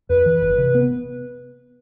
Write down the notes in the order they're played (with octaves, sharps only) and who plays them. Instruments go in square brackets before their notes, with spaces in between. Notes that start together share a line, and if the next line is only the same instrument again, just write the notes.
[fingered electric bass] F2 [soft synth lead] B4
[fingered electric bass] E3
G1
C3
B3